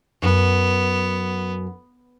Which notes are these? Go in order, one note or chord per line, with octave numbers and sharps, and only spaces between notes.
F#2 B3